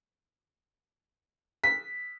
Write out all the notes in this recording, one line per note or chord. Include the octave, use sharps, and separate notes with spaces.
B6